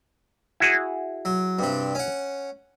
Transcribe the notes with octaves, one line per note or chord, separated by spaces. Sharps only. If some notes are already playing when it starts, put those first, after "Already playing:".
E4 F#4 G#4
F#3
G2 C3 D4
C#4 F#5